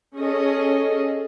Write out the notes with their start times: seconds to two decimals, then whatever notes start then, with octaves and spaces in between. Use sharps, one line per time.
0.16 C#4 G#4 A4 D#5